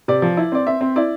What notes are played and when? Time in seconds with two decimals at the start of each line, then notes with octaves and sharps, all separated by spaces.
0.08 C3 D5
0.22 F3
0.37 E4
0.52 C4 D5
0.67 C4 E5
0.81 C4
0.96 E4 D5